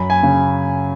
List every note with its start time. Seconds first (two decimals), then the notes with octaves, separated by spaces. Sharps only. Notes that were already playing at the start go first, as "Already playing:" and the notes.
Already playing: F#2 B5
0.10 G#5
0.23 C#3